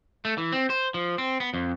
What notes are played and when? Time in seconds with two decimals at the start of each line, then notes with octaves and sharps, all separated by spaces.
0.25 A3
0.38 E3
0.52 C4
0.70 C5
0.94 F3
1.18 C4
1.40 B3
1.54 F2